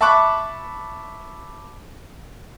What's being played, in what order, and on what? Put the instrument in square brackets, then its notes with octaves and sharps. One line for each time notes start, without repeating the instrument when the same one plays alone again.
[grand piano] E5 A5 B5 C#6 D6 F#6